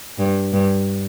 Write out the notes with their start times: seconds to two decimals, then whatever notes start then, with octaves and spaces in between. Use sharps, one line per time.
0.19 G2
0.53 G2